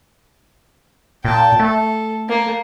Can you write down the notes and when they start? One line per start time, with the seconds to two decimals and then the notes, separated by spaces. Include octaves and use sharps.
1.25 A#2 G5 A5
1.59 A3 A4
2.29 A#3